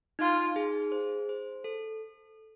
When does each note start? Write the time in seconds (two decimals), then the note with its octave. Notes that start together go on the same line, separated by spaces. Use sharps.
0.19 D#4 F4
0.56 G#4
0.92 C5
1.29 C5
1.64 A4